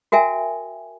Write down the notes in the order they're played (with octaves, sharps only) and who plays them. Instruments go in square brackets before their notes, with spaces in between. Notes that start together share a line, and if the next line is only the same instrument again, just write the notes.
[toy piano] F#4 A#4 E5 G5 G#5